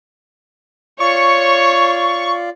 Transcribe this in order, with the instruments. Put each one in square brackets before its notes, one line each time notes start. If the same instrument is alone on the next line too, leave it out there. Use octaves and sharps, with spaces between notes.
[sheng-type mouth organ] F4 D5 [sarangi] C#5 [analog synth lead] C#6